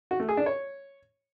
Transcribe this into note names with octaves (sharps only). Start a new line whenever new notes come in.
F#4
A3
G#4
D4
C#5